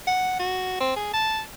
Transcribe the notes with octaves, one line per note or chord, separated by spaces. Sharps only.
F#5
F#4
C4
G#4
A5